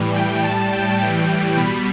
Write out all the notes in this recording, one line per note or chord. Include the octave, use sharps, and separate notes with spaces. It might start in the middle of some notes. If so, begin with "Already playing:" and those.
Already playing: A2 E3 G3
G5
A2 G3 A5
G5
A2 E3 G3
B2 G3 B5